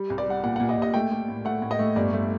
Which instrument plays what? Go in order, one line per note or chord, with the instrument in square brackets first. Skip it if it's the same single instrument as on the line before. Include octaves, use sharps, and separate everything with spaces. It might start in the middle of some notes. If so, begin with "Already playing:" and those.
Already playing: [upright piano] G3
C2
D5
G3 F#5
A#2 F#5
F#5
A#2
D#5
A#2
D#5
A3 G5
A3
A2
A3 F#5
A2
D#5
A3
G1 D5
A3